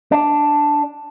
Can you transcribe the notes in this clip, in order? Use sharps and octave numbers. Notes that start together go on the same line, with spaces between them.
D4